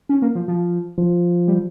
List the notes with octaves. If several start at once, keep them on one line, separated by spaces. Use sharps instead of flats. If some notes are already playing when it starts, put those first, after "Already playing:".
C#4
A#3
F3
F3
F3
G3